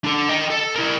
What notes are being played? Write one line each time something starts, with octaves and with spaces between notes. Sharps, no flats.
D4 A4
D#5 G5
A4
E4 A#4